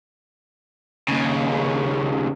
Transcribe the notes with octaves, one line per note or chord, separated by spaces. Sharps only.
D#2 C#3